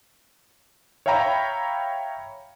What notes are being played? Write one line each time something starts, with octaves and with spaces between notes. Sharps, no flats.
C#5 E5 F5 G5 A#5 B5